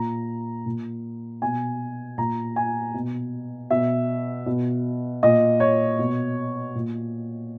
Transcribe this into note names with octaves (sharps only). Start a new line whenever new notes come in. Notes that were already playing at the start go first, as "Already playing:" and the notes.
Already playing: A#2 A#5
A#2
B2 G#5
A#2 A#5
G#5
B2
B2 E5
B2
A#2 D#5
C#5
B2
A#2